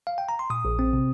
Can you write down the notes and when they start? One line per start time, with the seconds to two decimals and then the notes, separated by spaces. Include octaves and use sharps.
0.07 F5
0.18 G5
0.29 A#5
0.39 C6
0.50 A#2 D#6
0.65 A#1
0.79 C4
0.93 C3